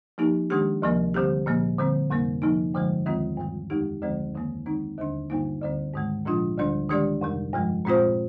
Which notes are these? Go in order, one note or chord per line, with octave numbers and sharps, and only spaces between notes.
F3 A#3 D#4 G4
D#3 G#3 D4 G4
D2 C3 F3 A#3
D3 G3 C4 G4
A#2 F3 A#3
D3 G3 C4
F2 C3 G3 A#3
C3 F3 A#3 D#4
G2 D3 F3 G#3
D#2 D#3 G#3 C4 F4
G2 D#3 G3
F2 D#3 G#3 D#4 G4
D2 D3 F3 G#3 C4
F2 D#3 A#3
D#3 G#3 C4 D#4
D#2 D3 G3 D4
G2 D3 G3 A#3 D#4
D2 D3 G3 C4
G#2 D#3 G#3
A#2 F3 G#3 D4 F4
D2 D3 G3 D4
D#3 G#3 D4 G4 D5
F2 C3 G3
G2 F3 G#3
A#2 G#3 C4 F4 C5